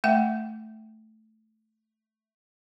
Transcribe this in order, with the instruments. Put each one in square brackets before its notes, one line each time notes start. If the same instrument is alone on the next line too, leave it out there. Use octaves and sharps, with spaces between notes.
[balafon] A3 E5 G5